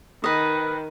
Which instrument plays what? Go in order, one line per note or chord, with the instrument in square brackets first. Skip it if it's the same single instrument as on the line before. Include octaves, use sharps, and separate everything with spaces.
[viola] D#3 [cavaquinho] B4 D#5